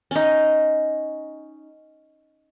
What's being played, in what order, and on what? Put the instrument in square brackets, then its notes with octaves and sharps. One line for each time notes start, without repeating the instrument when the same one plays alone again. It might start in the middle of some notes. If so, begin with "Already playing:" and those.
[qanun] C#4 D#4